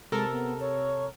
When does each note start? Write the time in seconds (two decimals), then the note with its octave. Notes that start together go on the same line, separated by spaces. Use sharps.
0.12 C3 G#3 A4 A#4
0.32 B3
0.60 C#5